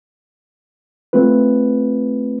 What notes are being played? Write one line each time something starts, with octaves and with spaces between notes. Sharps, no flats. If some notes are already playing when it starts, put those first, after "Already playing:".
A3 C4 F4 B4